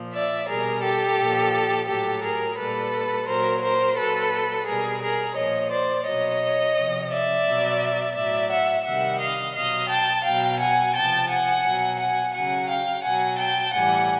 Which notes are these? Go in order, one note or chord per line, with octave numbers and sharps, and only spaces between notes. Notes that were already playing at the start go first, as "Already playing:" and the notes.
Already playing: A#2 F3
D5 E5
B2 G3 G#4 A#4
G4 A4
A#2 F3
A2 F#3 G4 A4
G#4 A#4
A#2 G3 A4 B4
A#2 F#3 A#4 C5
A#4 C5
A#2 F#3 A4 B4
B2 G3 G#4 A#4
G#4 A#4
A#2 F3 C#5 D#5
C5 D5
B2 F#3 C#5 D#5
C3 F3
D5 E5
B2 F#3
A2 F#3 D5 E5
E5 F#5
C3 D#3 G3 E5 F#5
D#5 F5
B2 F#3 D#5 F5
G5 A5
B2 F#3 F5 G5
F#5 G#5
C3 F3 G5 A5
F#5 G#5
B2 F#3
F#5 G#5
C#3 F#3 F#5 G#5
F5 G5
B2 F#3 F#5 G#5
G5 A5
A2 E3 G3 F#5 G#5